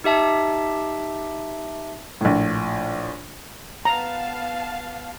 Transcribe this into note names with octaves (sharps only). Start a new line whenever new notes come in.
D#4 G4 E5 A5
A#1 A2
B3 F5 A5 A#5